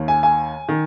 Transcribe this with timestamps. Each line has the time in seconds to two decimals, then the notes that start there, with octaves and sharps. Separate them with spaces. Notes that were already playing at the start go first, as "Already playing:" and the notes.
Already playing: D#2 D#3
0.08 G#5
0.23 G#5
0.69 D#3